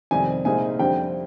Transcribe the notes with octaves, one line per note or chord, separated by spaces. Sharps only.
F2 C3 D#3 G3 G#5
C2 A#2 G#3 C4 D#4 G#5
F2 D3 G3 C4 G5